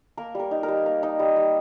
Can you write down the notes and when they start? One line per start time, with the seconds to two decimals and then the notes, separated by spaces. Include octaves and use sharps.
0.17 A#3 A#4
0.35 G3 A#4
0.51 D#4
0.63 A#4
0.68 G3
0.86 A#3
1.03 D#4
1.19 G3
1.36 G3